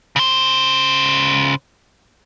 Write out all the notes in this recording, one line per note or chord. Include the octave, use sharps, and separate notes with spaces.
C#3 C5